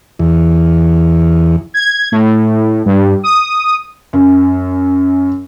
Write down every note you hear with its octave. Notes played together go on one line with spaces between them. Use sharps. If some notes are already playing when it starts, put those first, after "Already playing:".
E2
G#6
A2
G2
D#6
F#2